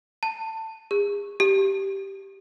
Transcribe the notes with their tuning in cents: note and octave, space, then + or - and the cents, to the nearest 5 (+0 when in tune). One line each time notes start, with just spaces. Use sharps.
A5 +20
G#4 -35
G4 -5